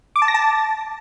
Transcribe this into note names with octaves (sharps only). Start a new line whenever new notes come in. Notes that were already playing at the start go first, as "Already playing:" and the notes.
D6
A5
A#6
A5